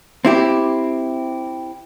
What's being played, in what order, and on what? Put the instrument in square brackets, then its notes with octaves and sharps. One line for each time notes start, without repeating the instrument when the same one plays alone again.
[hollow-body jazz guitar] C4 E4 G4